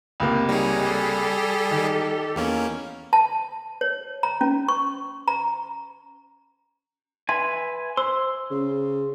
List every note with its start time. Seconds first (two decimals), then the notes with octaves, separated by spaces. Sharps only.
0.20 C#2 C3 A#3
0.49 G3 D#4 G#4 C#5
0.84 G4 A4
1.71 D#3
2.36 E2 A#3 C#4
3.13 A5
3.81 C#5
4.23 A#5
4.41 C#4
4.68 C#6
5.28 A#5
7.29 B4 E5 G#5 C6
7.97 C5 C6 E6
8.51 C#3